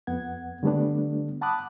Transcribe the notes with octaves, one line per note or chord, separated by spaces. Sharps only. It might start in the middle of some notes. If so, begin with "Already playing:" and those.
F2 B3 F#5 G#6
D3 G3 A3 B3 D4
F#5 A5 B5 D6 D#6 F#6